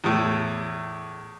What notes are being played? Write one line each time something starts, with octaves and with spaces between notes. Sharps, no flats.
E2 A2